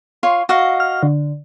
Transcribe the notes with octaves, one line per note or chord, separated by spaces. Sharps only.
F4 C#5 C6
F#4 D#5 F5
F6
D3